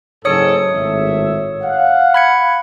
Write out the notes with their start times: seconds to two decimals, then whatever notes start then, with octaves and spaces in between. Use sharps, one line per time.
0.25 F#1 G#2 A4 C#5 D#6 C#7
0.72 G#1 A2 E5
1.63 F5 F#5
2.14 B5 G#6 C#7